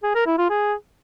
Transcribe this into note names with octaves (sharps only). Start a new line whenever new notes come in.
G#4
A#4
E4
F4
G#4